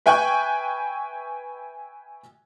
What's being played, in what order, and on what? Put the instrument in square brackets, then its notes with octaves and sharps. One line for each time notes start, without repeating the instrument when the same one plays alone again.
[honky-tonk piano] B4 E5 G5 G#5 C#6 F#6